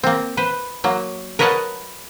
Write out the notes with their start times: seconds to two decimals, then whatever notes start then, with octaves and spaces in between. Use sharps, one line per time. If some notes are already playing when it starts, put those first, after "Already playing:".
0.04 A#3 C4
0.37 B4 C5
0.84 F#3 A#3
1.39 A#4 B4 C#5 D#5 F#5 A5